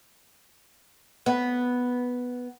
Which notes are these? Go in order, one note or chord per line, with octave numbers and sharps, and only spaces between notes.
B3